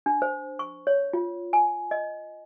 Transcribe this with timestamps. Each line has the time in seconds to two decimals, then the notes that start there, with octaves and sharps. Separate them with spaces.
0.06 D4
0.22 C5
0.59 C#6
0.87 C#5
1.13 F4
1.53 G#5
1.91 D#5